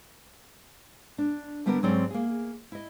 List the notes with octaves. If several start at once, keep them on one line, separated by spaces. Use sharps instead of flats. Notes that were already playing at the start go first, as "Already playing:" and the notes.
D4
D3 G3 B3 D4 A4 A#4
G#2 F#3 G3 C4 C#4 D5
A#3 G#4
E4 D#5